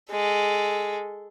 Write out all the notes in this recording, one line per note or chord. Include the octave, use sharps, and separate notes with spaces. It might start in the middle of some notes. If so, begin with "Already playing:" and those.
G#3 A4